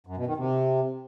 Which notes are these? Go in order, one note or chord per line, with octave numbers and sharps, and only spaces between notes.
F#2
B2
D#3
C3